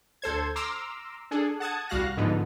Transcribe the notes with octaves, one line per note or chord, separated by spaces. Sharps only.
D2 A4 C5 G#6
A#5 C6 D6 E6 F6
D4 G#4 A4
F#5 A5 D#6 G#6
C2 G3 F#4 F5 F#6 A#6
G#2 D3 F3 B3 D#4